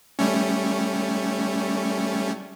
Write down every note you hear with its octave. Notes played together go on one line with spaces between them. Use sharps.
G3 A3 C#4